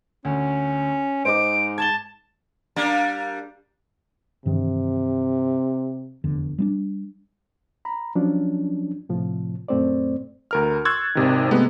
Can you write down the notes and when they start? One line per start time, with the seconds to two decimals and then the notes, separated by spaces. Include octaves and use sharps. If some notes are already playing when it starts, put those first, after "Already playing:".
0.25 D2 C#4
1.25 G#2 C5 D#5 D6 D7
1.78 A5 G#6 A6 G7
2.76 G3 A#3 D4
4.46 G2 C3 D#3 E3
6.24 F1 E2 D3
6.58 G3 B3 D4
7.85 A#5 B5
8.15 F3 F#3 C#4 D4
9.09 A2 C3 F3
9.68 F#2 A#2 A3 C4 C5 D5
10.51 D2 A#4 F6
10.85 C6 C#6 E6 F#6 G#6 A6
11.15 G#1 C3 D#3
11.51 C3 G#3 A3 B3